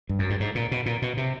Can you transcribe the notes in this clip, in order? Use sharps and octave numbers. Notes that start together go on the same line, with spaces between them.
G2
F#2
G2
G#2
A#2
B2
A#2
B2
C3